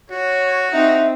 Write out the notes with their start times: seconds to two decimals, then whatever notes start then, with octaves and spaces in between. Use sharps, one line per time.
0.11 F#4 C#5
0.72 C4 D#4 E5